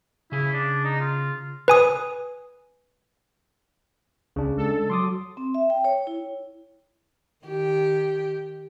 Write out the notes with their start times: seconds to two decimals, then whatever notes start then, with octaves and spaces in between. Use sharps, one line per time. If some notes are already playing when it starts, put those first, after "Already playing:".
0.32 C#3 E4 G#4
0.53 D4
0.84 D#4
1.00 F4
1.68 B4 G#5 D#6
4.36 C#2 C#3 D4
4.57 G#3 A4
4.90 F#3 C6 D6 D#6
5.37 C4
5.54 E5
5.70 G5
5.85 C#5
6.07 E4
7.46 D#3 G4